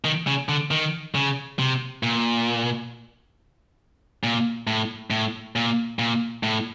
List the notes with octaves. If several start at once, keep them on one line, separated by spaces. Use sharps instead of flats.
D#3
C#3
D3
D#3
C#3
C3
A#2
A#2
A2
A2
A#2
A#2
A2